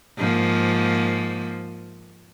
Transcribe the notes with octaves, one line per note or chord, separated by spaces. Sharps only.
G#2 F3 A#3